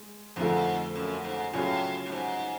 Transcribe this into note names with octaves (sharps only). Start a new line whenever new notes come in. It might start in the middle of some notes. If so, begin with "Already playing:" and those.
Already playing: G#3
F2 G#2 D3 F3 A3
F#2
G#2
A2 C#3 F#3 C#4 F4
A2
G#2